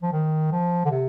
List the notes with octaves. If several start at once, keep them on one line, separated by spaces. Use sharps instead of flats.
F3
D#3
F3
D3
C3